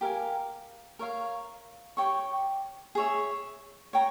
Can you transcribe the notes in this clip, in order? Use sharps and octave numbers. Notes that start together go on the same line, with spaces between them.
G4 A#4 F5 G#5
A#4 C#5 F5
G4 C#5 G5 C#6
G#4 C#5 E5
C#5 G5 A#5